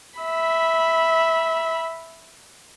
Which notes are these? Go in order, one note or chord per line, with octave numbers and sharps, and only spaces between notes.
E5 B5